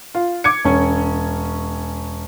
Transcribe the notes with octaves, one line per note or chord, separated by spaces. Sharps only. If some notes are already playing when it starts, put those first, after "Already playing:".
F4
D6 G#6 C#7
E1 C#4